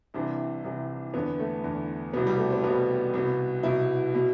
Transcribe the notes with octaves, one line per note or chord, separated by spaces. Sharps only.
C2 C3 E3 D4
C2 C3 E3
E2 D3 B3
A3
E2 D3
C2 B2 B3
G3
A3
C4
C2 B2 B3
C2 B2
C2 B2 E4
B2